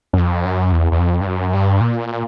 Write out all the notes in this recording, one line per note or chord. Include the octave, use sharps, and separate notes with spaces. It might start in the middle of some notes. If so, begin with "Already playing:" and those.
F#2
F2
F#2
E2
E2
F2
G2
F#2
G2
A#2